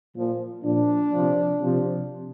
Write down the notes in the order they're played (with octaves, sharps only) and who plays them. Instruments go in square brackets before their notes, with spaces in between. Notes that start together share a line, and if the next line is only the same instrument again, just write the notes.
[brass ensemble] A#2 F3
A#2 F3 D4
C3 F3
C3 F3